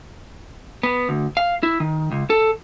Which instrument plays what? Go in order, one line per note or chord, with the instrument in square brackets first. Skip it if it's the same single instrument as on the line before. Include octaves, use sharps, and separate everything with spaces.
[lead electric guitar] B3
D2
F5
E4
D#3
C#2
A4